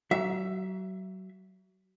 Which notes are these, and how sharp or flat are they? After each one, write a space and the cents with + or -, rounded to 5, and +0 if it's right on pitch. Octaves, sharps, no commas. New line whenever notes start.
F#3 +30 E5 +15